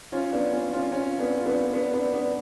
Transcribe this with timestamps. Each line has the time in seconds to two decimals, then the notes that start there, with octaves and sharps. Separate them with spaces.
0.12 C#4 F4
0.33 B3 D4
0.53 C#4 F4
0.72 C#4 F4
0.92 C#4 F4
1.19 B3 D4
1.38 F4
1.46 B3 D4
1.73 B3 D4
1.93 B3 D4
2.13 B3 D4